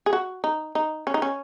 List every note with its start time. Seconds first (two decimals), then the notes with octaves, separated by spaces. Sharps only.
0.06 G#4
0.13 F#4
0.44 D#4
0.75 D#4
1.07 C#4
1.14 D#4
1.22 C#4